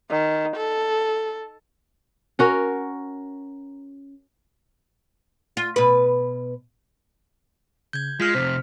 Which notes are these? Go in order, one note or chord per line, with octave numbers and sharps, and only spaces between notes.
D#3
A4
C#4 F#4 A#4
F4
B2 B4
C#3 G6 G#6
G#3 F4 F6 B6
F2 C3 C5